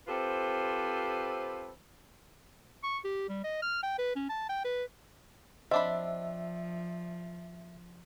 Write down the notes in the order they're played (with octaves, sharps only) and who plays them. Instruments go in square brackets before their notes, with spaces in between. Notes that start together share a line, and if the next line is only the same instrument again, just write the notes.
[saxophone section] C4 F4 G4 A4 B4 C5
[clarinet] C#6
G4
G3
D#5
F6
G5
B4
C#4
A5
G5
B4
[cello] F3 [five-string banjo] C4 D4 B5 [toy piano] D#5 [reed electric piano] E5